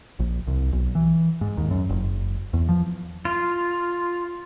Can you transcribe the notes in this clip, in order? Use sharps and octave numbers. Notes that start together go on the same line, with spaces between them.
A#1
C2
B1
E3
G#2
D#2
F#2
F#1
E2
F3
F4